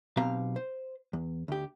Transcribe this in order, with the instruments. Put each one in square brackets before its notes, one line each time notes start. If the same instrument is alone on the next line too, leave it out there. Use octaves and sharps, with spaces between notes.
[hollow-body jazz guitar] B1 B2 C4 G4 F5 A#5
C5
E2
D2 G4